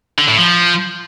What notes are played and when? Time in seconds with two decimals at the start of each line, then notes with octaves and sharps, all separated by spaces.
0.18 D3
0.28 A2
0.38 F3